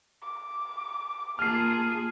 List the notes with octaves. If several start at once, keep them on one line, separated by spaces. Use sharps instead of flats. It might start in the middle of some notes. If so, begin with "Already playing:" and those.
D6
A#3 F4 G#4 A5 F6 C7